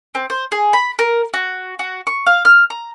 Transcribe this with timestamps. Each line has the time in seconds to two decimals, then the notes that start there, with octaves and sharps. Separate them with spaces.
0.15 C4
0.30 C5
0.52 G#4
0.73 B5
0.99 A#4
1.34 F#4
1.79 F#4
2.07 C#6
2.27 F5
2.45 F6
2.70 A#5